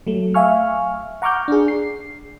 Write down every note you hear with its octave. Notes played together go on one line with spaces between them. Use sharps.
F#3 A3
E5 F5 G#5 C#6 F6
F#5 A#5 C#6 D6 F6 G6
D4 G#4
C7